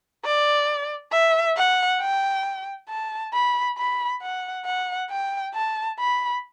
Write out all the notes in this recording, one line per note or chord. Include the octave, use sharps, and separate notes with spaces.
D5
E5
F#5
G5
A5
B5
B5
F#5
F#5
G5
A5
B5